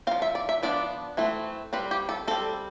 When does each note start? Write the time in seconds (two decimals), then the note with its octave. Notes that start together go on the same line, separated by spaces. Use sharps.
0.07 C4 F5
0.11 F3
0.22 E5
0.35 D5
0.49 E5
0.63 F3 B3 D4 D5
1.17 E3 A3 C4
1.73 G3 C4 B4
1.91 G4
2.09 A4
2.27 G3 C4 A4